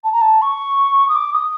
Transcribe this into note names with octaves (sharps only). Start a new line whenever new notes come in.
A5
A#5
A5
C#6
D#6
D6
D#6